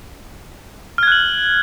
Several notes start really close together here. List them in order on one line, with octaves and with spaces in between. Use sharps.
F6 G#6 F#6 F#7